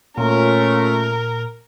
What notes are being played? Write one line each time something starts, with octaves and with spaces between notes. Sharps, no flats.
A#2 A3 C#4 F4 A#4